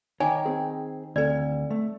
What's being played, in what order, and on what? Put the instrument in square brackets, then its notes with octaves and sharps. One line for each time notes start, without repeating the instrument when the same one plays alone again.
[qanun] D#3 [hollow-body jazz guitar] C#5 D5 [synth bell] G5 [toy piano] G#5
[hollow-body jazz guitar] C4 G#4
[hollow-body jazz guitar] D2 [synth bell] C4 A4 [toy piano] D5
[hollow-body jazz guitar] A3